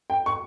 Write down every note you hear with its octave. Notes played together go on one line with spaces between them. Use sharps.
G5
C#6